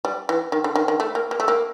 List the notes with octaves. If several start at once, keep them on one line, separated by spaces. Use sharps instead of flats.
G3
E3
D#3
D3
D#3
D#3
A3
A#3
A#3
A3
A#3